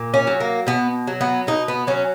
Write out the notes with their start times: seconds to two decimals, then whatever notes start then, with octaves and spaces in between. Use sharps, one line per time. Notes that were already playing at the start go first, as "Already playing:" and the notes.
Already playing: A#2
0.14 C#4
0.27 F#3
0.40 A#3
0.67 B2 B3
1.07 F#3
1.21 B3
1.47 B2 D#4
1.68 B3
1.87 F#3 C#4